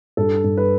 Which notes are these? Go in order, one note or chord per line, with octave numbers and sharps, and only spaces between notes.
G2 A4
G2
B4